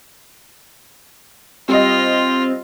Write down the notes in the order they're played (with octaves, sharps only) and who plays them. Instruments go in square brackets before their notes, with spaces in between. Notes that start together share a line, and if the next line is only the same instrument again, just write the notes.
[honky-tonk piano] G3 D#5 [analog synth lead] C4 [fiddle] F4